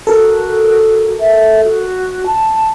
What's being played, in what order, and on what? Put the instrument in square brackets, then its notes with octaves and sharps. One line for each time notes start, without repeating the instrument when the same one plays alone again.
[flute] F#4 [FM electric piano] A4 A#4
[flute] E5
F#4
A5